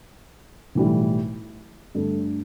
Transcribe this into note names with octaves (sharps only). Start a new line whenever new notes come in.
B1 A2 E3 G3
G2 D3 A3 D4